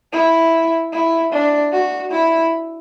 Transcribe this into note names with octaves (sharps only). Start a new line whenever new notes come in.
E4
E4
D4
F#4
E4